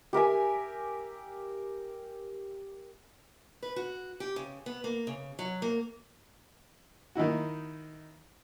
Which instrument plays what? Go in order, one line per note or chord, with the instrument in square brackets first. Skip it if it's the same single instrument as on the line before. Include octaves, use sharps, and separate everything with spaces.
[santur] G4 A#4 E5 G#5
[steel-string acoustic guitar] B4
F#4
G4
C#3
B3
A#3
C#3
F#3
A#3
[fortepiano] D#3 D#4 E4 F#4